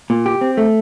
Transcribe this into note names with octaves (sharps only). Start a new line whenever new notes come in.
A#2
G4
C4
A3